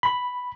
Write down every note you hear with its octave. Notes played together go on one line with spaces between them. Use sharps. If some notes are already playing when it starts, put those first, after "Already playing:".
B5